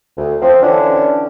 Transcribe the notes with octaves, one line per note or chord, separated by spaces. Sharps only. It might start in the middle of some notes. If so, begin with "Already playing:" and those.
D2
F3 C4
D3 E3 C#4 D4